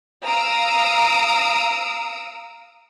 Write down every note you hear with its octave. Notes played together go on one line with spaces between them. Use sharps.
F5 A#5 D#6 E6 D7